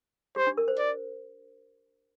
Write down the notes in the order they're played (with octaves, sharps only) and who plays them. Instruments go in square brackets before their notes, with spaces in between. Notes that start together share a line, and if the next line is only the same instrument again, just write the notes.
[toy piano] G4 [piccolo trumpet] C5
[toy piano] D4
A#4
C5
[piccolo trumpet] D5